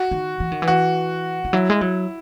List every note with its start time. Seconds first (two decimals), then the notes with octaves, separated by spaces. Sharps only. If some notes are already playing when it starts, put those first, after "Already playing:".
Already playing: F#4
0.11 D#3
0.40 E3
0.52 D#3
0.62 E3
0.68 F#4
1.45 E3
1.53 F#3 E4
1.70 G#3
1.81 F#3